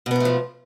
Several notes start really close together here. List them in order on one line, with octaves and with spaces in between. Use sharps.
B2 B3 G#2 A3 F3